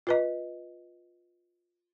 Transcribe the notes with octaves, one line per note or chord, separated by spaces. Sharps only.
F4 B4 D#5